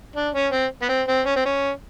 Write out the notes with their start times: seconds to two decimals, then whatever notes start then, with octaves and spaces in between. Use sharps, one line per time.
0.16 D4
0.34 C#4
0.52 C4
0.82 B3
0.89 C4
1.08 C4
1.26 C#4
1.36 C4
1.46 C#4